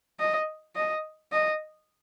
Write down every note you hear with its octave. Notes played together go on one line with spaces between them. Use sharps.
D#5
D#5
D#5